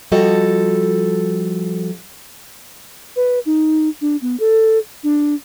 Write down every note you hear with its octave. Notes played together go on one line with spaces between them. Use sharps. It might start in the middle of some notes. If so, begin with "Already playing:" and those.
F3 G3 F#4 A4 D#5
B4
D#4
D4
B3
A4
D4